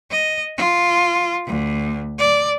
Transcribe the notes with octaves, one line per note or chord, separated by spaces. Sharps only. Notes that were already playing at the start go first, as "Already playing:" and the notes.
D#5
F4
D2
D5